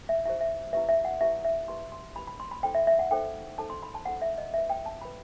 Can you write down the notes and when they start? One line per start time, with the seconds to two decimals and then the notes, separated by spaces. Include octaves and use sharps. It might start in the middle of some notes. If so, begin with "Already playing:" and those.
0.09 E5
0.25 E4 G4 C5 E5
0.41 E5
0.73 E4 G4 B4 E5
0.89 E5
1.05 F#5
1.21 E4 G4 B4 E5
1.45 E5
1.68 E4 G4 B4 C6
1.92 C6
2.16 E4 G4 B4 B5
2.27 B5
2.40 C6
2.51 B5
2.63 D#4 A4 C5 G5
2.75 E5
2.87 E5
2.99 F#5
3.11 D#4 A4 C5 G5
3.58 D#4 A4 C5 A5
3.70 C6
3.82 B5
3.94 A5
4.05 D#4 A4 C5 F#5
4.22 E5
4.38 D#5
4.54 F#4 B4 E5
4.70 G5
4.86 A5
5.01 F#4 B4 B5